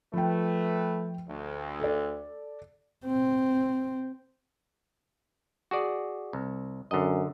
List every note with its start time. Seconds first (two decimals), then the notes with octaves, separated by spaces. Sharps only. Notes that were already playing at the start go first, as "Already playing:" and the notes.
0.13 F3 A3 B4 G5
1.29 D2
1.80 A4 D5
3.06 C4
5.71 F#4 G#4 D5
6.33 C2
6.91 F#2 D3 D#5